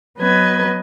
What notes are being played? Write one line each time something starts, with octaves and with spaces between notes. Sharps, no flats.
F#3 B3 B4 D#5 G#6